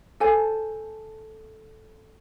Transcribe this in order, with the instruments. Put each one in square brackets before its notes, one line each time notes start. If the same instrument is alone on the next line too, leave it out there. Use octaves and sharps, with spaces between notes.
[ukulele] A4 C5 G#5 A5